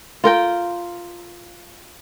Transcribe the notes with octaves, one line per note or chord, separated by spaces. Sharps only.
F4 A#4 G5